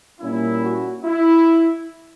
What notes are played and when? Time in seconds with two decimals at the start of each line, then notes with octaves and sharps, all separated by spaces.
0.21 A#2 G3 A#3 C#4 E4
0.63 F#4
1.04 E4